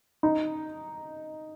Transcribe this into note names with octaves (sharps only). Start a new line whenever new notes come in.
D#4